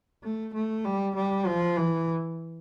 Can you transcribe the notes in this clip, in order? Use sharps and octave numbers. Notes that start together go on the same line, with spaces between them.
A3
A3
G3
G3
F3
E3